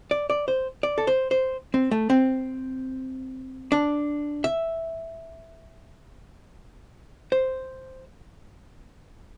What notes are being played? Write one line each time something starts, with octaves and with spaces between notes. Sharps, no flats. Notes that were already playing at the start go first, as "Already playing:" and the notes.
D5
D5
C5
D5
A4
C5
C5
C4
A3
C4
D4
E5
C5